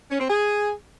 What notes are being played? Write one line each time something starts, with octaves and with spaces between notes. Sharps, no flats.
C#4
C4
G#4